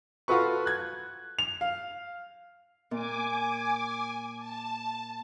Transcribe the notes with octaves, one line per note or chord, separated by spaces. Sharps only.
F4 F#4 A4 B4 C#6
F#6 G#6
F7
F5
A#2 G#5 D6
A5